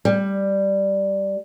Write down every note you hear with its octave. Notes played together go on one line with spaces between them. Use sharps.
G3